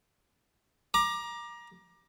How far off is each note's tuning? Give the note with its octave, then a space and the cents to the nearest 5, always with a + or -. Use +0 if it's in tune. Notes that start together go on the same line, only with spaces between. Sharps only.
A#5 +25 D6 +20